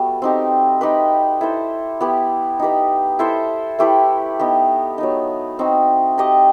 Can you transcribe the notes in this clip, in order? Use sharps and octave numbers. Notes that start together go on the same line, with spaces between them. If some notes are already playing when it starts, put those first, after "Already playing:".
Already playing: G3 A3 B3 F#4
C4 D#4 G4
D#4 G4 B4
E4 A4 C5
B3 E4 G4 B4
D#4 G4 B4
E4 A4 C5 E5
A3 E4 G4 B4
B3 D#4 G4
F#3 B3 D#4
C4 D#4 F#4
D#4 G4 D#5